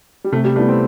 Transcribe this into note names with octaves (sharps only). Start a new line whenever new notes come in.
G3
C3 A3
G3
G3 A3 B3 E4
C4